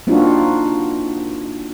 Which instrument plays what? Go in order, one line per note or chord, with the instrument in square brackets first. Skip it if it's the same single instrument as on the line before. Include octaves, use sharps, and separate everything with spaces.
[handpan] A#3 C4 D4 D#4 F4 F#4